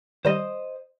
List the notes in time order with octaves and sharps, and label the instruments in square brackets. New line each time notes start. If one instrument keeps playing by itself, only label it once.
[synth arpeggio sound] D#3 G3 A#6 [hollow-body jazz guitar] C5 D#5